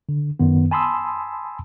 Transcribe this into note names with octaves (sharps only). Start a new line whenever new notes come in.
D3
F#2 D#3 B3
G#5 A5 B5 C6 D#6 E6